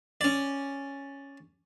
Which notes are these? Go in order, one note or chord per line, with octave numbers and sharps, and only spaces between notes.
C#4 D5